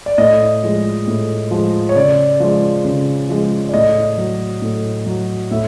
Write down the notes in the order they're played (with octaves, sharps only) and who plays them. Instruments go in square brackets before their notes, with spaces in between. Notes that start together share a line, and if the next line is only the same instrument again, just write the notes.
[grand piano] D5
A2 D#5
F3 G#3
A2
F3 G#3
C#5
C#3 D5
F3 G#3
C#3
F3 G#3
D5
A2 D#5
F#3
A2
F#3
A2 E5